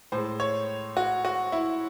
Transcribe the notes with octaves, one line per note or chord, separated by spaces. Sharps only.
A2 G#3 C5
C#5
F#4
F#4
E4